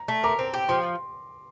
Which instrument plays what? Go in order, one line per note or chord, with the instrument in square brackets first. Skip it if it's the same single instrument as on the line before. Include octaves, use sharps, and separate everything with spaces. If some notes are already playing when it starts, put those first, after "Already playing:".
Already playing: [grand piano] A#5
[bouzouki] A3
[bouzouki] A#4 [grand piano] A#5 D6
[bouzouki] C4
G4
[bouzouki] F3 [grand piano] C6